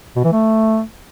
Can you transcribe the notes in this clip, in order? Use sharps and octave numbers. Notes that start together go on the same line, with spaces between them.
B2
E3
A3